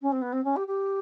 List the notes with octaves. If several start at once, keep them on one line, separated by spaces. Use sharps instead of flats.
C#4
C4
B3
C4
C#4
G4
G4